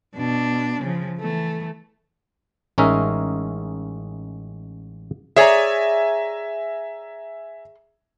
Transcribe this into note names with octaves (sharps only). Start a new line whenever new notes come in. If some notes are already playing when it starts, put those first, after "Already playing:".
B2 D4
C#3 F3
E3 A3
A1 G#3 C#4 D#4 A#4 E5
G#4 C#5 D5 E5 G#5 A#5